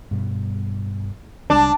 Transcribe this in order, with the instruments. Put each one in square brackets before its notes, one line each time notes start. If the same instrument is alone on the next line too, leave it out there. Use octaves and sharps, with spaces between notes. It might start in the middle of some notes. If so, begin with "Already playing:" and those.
[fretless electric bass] G2 B2 G3
[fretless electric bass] C2 G3 G#3 [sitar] D4